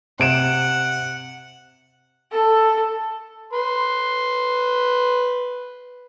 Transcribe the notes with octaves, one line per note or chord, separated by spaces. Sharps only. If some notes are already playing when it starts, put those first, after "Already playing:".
C3 F#5 D7 E7
A4
B4 C6